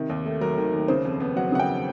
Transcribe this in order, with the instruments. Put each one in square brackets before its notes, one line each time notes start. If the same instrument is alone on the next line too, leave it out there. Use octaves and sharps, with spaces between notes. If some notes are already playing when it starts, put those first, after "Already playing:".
Already playing: [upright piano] C3 D#3
D#2
A3
F#3 A#4
D#3
D#2
C#3 C5
F2
B3
F#3 F#5
C#3 F#5
G5